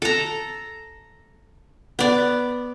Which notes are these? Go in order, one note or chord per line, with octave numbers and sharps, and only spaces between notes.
A4 A#5
B3 D5